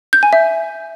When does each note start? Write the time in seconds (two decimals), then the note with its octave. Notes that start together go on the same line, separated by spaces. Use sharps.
0.13 G6
0.23 G#5
0.33 E5